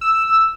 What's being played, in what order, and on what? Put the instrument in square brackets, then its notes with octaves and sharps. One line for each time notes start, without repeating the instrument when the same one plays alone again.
[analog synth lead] E6